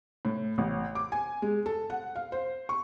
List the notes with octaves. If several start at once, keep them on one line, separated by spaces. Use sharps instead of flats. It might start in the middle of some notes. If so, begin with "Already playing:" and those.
A2
A1
D6
G#5
G#3
A4
F#5
F5
C5
C#6